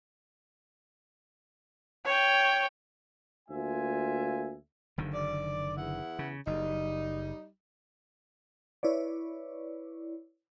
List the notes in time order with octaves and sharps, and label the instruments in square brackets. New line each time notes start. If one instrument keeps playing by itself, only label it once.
[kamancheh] C#5 G5
[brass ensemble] D2 A#3 F4 E5 G#5
[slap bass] F#1 D3 D#3
[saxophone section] D5
E2 E4 F#5
[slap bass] C#3
[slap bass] F#1 [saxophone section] G3 D#4
[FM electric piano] E4 B4 C#5 D5